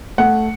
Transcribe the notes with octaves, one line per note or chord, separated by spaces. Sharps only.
A3 F#5